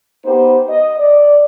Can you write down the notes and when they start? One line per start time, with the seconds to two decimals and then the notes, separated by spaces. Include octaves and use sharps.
0.25 B3 D#4 G4 C5
0.69 D#5
0.98 D5